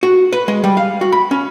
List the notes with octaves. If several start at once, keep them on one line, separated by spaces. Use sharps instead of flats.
F#4
B4
G#3
G3
F5
F#4
B5
C#4